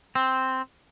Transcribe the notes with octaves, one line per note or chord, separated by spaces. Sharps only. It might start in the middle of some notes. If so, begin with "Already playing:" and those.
C4